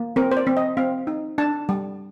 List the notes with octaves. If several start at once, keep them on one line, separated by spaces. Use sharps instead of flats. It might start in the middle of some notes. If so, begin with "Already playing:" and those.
Already playing: A#3
C4 A#4
C5
D5
C4
D#5
C4 F5
D#4
D4 A5
G3